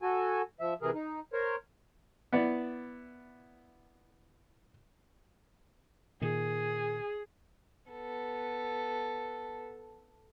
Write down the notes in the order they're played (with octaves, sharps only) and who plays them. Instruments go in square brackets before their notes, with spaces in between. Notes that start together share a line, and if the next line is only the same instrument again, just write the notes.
[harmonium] F#4 A4 G#5
F3 E5
C3 E3 G#4 A#4
D#4
A#4 C5 C#5
[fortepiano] B3 E4 D5
[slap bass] A#2 D#3 [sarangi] G#4
[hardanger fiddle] B3 A4